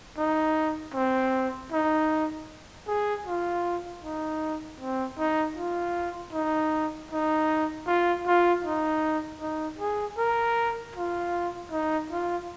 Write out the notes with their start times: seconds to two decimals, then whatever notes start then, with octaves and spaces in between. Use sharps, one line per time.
0.17 D#4
0.94 C4
1.72 D#4
2.87 G#4
3.26 F4
4.03 D#4
4.80 C4
5.19 D#4
5.57 F4
6.33 D#4
7.11 D#4
7.87 F4
8.26 F4
8.64 D#4
9.41 D#4
9.79 G#4
10.18 A#4
10.95 F4
11.71 D#4
12.10 F4